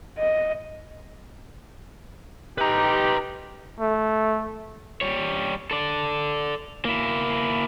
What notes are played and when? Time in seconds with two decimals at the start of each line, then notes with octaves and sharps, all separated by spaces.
0.19 D#5
2.58 D#4 G4 B4 A#5
3.80 A3
5.01 G3 C#5
5.71 A4 D5
6.85 A#3 E4